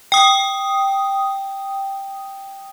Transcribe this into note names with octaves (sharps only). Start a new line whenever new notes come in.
G5 D#6